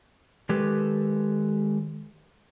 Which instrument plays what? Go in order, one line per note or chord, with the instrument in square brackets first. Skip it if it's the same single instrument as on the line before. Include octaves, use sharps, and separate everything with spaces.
[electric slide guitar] D#3 G#3 G4 A4 B4